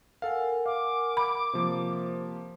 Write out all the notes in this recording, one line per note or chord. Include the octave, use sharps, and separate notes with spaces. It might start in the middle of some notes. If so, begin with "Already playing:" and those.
A4 A#4 F5 F#5 G#5
F5 D6
B5
C3 F3 A#3 C5